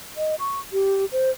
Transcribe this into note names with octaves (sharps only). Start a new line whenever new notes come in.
D#5
C#6
G4
C5